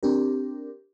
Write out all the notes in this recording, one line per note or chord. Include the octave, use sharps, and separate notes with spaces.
C4 D4 G4 A#4